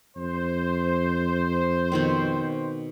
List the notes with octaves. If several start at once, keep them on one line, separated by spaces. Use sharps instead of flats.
F2 C5
B2 D#3 C4